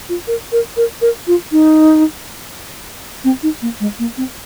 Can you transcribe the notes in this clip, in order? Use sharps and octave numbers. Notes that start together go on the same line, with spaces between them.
F4
A#4
A#4
A#4
A#4
F4
D#4
C4
D#4
A#3
G#3
A#3
C4